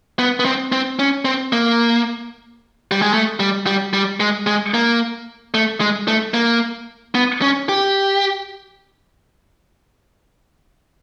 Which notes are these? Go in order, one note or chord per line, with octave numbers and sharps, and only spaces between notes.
B3
B3
C4
C4
C#4
C4
A#3
G3
G#3
A3
G3
G3
G3
G#3
G#3
A#3
A3
G#3
A3
A#3
B3
C#4
G4